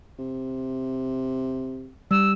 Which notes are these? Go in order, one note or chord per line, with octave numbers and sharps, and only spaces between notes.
C3
G3 E6